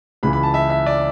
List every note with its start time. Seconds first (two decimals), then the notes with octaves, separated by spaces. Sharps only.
0.23 C#2 C#3 E3 B5
0.33 B5
0.43 A5
0.54 E5
0.70 E5
0.86 D5